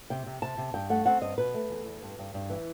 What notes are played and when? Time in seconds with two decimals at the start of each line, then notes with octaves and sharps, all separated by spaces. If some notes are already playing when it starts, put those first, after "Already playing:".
0.10 C3 G5
0.26 C3
0.42 C3 A5
0.58 C3
0.74 G2 G5
0.90 A3 F#5
1.06 C4 F#5
1.22 G2 D#5
1.38 B2 B4
1.54 A3
1.70 E2
1.86 E2
2.03 G2
2.19 G2
2.34 G2
2.50 E3